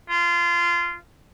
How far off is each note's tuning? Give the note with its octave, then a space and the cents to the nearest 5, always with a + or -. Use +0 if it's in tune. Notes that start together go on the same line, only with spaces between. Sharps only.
F4 -20